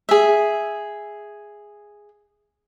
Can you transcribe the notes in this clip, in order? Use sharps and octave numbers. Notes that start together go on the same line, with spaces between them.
G#4 E5